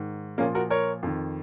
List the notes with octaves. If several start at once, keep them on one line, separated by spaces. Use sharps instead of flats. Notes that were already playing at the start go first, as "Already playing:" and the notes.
Already playing: G#2 D#3
A#2 F3 A#3 C#4
F#4 A#4
A#4 C#5
F2 D#3